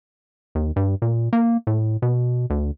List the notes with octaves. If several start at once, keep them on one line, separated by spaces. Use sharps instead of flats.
D#2
G2
A#2
A#3
A2
B2
D2